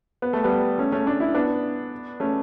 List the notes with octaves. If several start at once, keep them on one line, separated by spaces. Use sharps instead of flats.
B3
A3
G3 B3
A3 C#4
A3 C#4
D4
E4
B3 D4
A3 C#4